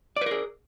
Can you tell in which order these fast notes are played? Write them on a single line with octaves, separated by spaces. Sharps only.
D5 B4 A#4 G#4